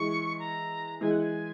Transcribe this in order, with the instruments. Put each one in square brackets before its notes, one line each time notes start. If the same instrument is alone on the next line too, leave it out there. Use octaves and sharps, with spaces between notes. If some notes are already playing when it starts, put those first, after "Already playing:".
Already playing: [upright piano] E3 G#3 [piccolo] C#6
[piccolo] A#5
[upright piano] E3 G#3 [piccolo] G#5
[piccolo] F#5
G#5